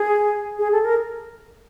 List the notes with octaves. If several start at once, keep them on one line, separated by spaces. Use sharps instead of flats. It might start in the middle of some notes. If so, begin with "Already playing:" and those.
Already playing: G#4
G#4
A4
A#4